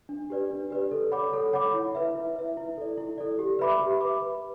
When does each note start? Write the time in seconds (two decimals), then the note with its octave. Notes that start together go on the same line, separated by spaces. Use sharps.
0.09 D4
0.30 G4 B4 D5
0.51 D4
0.71 G4 B4 D5
0.91 A4
1.12 C#5 F#5 B5 D6
1.33 A4
1.53 C#5 F#5 B5 D6
1.74 E4
1.95 B4 E5
2.15 E4
2.36 B4 E5
2.57 E4
2.77 A4 D5
2.97 E4
3.18 A4 D5
3.39 G4
3.59 B4 E5 B5 D6
3.81 G4
4.00 B4 E5 B5 D6
4.22 B4